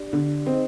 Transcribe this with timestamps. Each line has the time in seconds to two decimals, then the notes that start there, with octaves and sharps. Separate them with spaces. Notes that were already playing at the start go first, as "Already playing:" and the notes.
Already playing: D4 G4 D5
0.13 D3
0.46 C4 D#4 G#4 C5 D#5